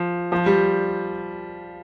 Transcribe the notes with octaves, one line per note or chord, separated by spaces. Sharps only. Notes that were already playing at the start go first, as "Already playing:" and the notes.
Already playing: F3
F3
G3